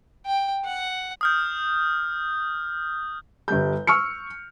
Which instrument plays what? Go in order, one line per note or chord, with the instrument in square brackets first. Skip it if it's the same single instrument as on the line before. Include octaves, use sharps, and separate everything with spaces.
[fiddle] G5
F#5
[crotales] D#6 F6 G6
[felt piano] G1 G3 G6
C#6 E6 F6 C#7